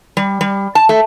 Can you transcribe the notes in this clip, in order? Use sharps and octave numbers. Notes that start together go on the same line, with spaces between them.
G3
G3
A5
A3